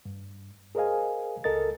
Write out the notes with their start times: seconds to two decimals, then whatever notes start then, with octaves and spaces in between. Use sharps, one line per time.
0.05 G2
0.75 G#4 A#4 C5 D#5 F5 G#5
1.44 C#2 A4 A#4 D#5 A6